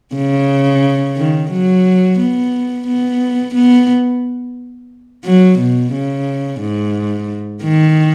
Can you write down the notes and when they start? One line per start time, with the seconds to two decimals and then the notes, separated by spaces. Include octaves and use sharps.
0.15 C#3
1.17 D#3
1.51 F#3
2.19 B3
2.87 B3
3.55 B3
5.25 F#3
5.59 B2
5.93 C#3
6.61 G#2
7.63 D#3